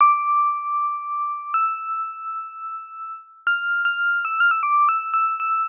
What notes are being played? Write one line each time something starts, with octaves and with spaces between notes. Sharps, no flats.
D6
E6
F6
F6
E6
F6
E6
D6
E6
E6
E6